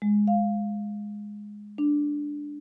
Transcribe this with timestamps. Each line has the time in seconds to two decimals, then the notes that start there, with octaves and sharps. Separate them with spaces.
0.02 G#3
0.28 F5
1.78 D4